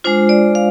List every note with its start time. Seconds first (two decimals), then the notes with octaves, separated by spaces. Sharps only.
0.04 G#3 D4 F4 C5
0.29 D5
0.55 F5